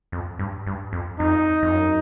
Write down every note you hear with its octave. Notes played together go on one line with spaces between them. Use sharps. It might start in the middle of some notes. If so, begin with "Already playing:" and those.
F2
G2
G2
F2
F2 D#4
F2
F#2